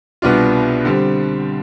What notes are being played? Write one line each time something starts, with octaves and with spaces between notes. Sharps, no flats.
C2 B2 B3 D4 F4
D3 G3 C4